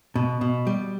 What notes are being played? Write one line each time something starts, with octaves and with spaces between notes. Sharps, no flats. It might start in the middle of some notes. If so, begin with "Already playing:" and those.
B2
B2
G3